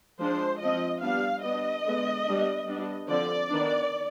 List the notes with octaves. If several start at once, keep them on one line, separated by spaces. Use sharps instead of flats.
F3 G#3 D4 C5
F3 C4 D#5
G3 B3 D4 F5
G3 B3 D4 D#5
D3 G#3 B3
G3 B3 D4
G3 B3 D4
D3 F3 C4 D5
D#3 B3 D4